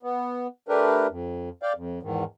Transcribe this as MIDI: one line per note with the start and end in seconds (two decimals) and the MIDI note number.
0.03 0.47 59
0.69 1.07 57
0.69 1.07 62
0.69 1.07 67
0.69 1.07 70
0.69 1.07 71
1.10 1.49 41
1.62 1.73 74
1.62 1.73 77
1.62 1.73 79
1.76 1.99 41
2.03 2.24 40
2.03 2.24 44
2.03 2.24 51